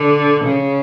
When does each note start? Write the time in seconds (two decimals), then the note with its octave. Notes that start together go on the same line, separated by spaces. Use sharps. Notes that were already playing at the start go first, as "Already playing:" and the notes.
Already playing: D3
0.44 C#3